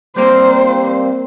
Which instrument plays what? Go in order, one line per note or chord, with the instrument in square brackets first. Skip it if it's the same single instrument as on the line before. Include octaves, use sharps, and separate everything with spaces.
[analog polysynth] G3 A#3 C4 [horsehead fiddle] C5